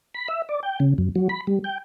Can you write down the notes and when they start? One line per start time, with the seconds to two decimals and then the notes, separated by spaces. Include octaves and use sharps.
0.14 B5
0.28 E5
0.49 D5
0.63 G5
0.80 C#3
0.98 F#2
1.15 F#3
1.29 B5
1.47 G3
1.64 G5